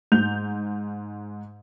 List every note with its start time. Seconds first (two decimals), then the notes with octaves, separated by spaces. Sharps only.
0.12 G#2 G6 F7